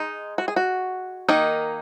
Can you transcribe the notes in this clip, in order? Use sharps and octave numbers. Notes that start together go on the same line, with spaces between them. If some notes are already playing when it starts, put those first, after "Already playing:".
Already playing: G#3 D#4
F#4
G#4
F#4
D#3 A#3 D#4